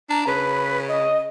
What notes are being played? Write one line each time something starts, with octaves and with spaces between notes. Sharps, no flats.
D4 A#5
C#3 B4
D#5